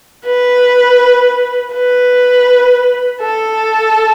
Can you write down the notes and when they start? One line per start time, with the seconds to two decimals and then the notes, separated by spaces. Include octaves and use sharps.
0.26 B4
1.74 B4
3.21 A4